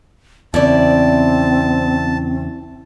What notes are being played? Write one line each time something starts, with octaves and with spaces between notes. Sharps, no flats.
E2 C#3 C4 E4 D5 A5